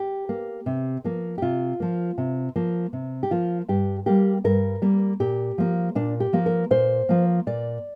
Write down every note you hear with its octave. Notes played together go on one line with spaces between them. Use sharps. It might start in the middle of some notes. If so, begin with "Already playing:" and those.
Already playing: G4
A#3
C3
F3 A#3
G4
C3 F4
F3 A#3
C3
F3 A#3
C3
G4
F3 A#3 F4
G2 G4
G3 A#3 G4
G2 A#4
G3 A#3
A#2 G4
F3 A#3
A#2 D4
G4
F3 A#3
A#4
A#2 C5
F3 A#3
A#2 D5